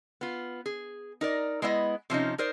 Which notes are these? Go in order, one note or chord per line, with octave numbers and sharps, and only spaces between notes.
B3 F4
G#4
D#4 A#4 D5
G#3 B3 E4 D#5
C3 F3 C#4 D#4
D#4 A#4 C5 D5